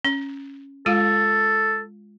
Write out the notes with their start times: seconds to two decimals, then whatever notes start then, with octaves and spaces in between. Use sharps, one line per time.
0.05 C#4
0.86 G#3 F4 A4 F5